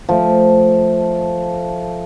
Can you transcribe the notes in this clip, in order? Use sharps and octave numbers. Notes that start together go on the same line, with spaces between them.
F3 A3